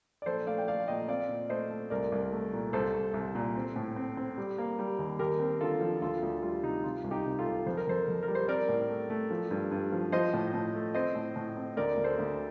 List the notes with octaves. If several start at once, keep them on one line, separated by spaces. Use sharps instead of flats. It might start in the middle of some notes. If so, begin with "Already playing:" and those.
D5
A#1 A4 C5
A3 D5 F5
G5
A3 D5 F5
A#2 D#5 G5
C4 D5 F5
A#2
A3 C5 D#5
A3
C2 A#4 D5
C2
A3
A#2
C2 A4 C5
C2
C2
A#2
C4
A2
C4
C4
G3
A#3
G3
D#2
D#2 G4 A#4
C4
D3 F4 A4
F3
D2 F4 A4
D2
G3 F4
C3 D#4
C3 F4
C2
D#4 G4
C3
F4 A4
C2
F2 C5
A#4
F2 A4 C5
F2
A#4
G3
C5
C4 A#4 D5
A2
A3
A3
F3
G2
G2
F3
F3 C5 D#5
A2
A2
A3
C4 C5 D#5
A2
A2
C4
D2 A#4 D5
D2
A4 C5
D2